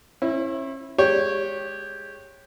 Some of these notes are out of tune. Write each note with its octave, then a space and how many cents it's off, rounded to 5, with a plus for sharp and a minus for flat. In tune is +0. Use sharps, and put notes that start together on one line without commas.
C#4 -40 E4 +0
G#3 +0 G4 +0 C#5 -15